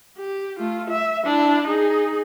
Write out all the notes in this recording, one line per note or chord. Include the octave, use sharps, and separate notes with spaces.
G4
A3 F4
E5
D4 E4
D#4 G#4